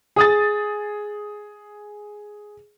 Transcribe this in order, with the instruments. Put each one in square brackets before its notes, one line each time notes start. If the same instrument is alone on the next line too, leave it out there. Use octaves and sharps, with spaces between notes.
[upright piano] G#4 D#6 A6